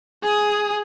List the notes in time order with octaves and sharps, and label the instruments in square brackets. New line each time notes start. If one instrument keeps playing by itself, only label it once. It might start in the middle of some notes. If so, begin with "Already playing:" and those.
[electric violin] G#4 D#6